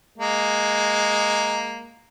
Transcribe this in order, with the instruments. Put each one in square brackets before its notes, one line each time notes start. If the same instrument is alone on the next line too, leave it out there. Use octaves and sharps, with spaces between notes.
[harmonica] G#3 A#3